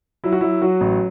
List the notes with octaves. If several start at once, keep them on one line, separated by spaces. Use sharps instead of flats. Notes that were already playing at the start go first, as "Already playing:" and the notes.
F#3 E4
F#4
F#3 E4
F#3 F#4
A1